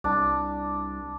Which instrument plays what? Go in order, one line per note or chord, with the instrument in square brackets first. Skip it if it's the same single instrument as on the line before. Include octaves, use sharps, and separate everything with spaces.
[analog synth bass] C2 [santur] D4